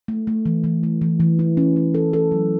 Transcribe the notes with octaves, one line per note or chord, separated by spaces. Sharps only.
A3
A3
E3
E3
A3
E3
E3
E4
C#4
C#4
A4
A4
F#3